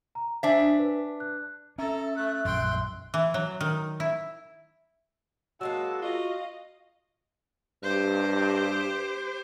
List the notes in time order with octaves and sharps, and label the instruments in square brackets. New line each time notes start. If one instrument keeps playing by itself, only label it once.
[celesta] A#5
[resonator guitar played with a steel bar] D4 E5 [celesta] C5 G#5 B6
[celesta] B4
F#6
[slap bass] C#4 [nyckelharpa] A4 [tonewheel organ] E5 [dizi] A#5
[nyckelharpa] A3 [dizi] F#6
[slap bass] A#1 F#2 [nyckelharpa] G5 C6
[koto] E3
F#3
D#3
E4
[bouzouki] F#3 G#3 A#3 [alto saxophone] F#4 [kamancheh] A5 [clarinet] E6
[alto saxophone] F4 [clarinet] F#4 [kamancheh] D#5 F5
[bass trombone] G2 [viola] G4 C5